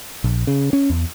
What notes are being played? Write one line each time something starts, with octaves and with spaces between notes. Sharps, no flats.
A#1
C#3
C#4
E2